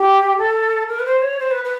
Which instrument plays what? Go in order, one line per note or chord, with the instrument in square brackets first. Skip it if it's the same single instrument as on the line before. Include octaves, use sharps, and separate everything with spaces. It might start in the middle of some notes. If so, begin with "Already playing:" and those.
Already playing: [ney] G4
A4
A#4
B4
C5
C#5
C5
B4
B4